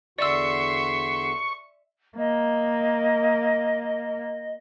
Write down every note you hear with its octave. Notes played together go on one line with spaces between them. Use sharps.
E2 D3 F#4 D5 E5 C6 C#6 E6
A#3 D#5